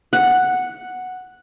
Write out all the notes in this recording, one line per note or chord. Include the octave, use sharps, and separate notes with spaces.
F#5